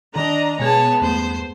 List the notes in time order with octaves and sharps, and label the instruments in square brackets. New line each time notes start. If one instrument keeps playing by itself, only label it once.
[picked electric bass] D#3 [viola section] D4 A#5 [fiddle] D#5
[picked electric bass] B2 [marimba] G#3 G#4 G#6 [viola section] B3 [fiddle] C#5 A5
[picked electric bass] E2 G2 A3 [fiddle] C5